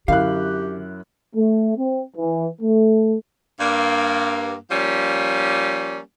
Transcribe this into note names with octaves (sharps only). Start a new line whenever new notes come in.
F#2 D3 E4 G4 F5 F#6
A3
C4
E3
A3
G2 A#3
F3 G3 A#3 C#4